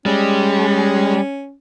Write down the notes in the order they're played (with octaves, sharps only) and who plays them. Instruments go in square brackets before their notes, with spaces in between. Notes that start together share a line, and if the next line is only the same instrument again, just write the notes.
[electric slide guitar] G3 [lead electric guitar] G#3 [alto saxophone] C#4